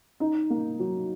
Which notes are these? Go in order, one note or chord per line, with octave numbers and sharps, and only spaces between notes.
D#4
A#3
F#3